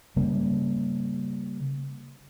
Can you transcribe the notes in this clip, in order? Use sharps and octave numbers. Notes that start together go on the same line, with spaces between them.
C#3 G3 A#3